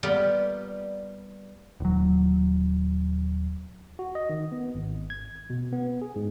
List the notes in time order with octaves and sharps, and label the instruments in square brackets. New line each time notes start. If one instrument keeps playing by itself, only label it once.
[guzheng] G3 A#3 B3 F4 G4
[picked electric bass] D#1 F#3
[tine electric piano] F#4
D#5
D#3
B3
G#1
G#6
B2
B3
G#4
G#2